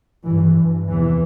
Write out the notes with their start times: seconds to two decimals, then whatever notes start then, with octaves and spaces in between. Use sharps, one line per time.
0.25 G2 E3
0.57 G2
0.88 E2 C3 E3